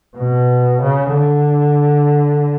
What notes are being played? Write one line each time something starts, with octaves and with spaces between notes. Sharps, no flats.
B2
C#3
D3